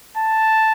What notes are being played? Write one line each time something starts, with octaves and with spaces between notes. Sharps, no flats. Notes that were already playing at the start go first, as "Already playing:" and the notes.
A5